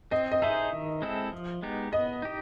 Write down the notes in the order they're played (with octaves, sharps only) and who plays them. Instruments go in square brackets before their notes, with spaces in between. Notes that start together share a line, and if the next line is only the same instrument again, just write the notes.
[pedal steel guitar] C4 [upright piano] D#5
[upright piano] D#5
[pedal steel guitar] D#4 G#4 C5 [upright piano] E5
[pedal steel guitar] D#3
G#3 C4 E4 A4
F3
G#3 B3 D#4 G4
[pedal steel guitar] B3 [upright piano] D#5
[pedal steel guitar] D#4 G4